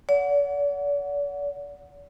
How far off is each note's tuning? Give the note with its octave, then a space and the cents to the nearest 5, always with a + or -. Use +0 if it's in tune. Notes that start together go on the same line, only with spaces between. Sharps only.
D5 -45 F#5 -15